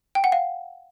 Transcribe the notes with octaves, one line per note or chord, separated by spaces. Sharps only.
G5
F#5
F5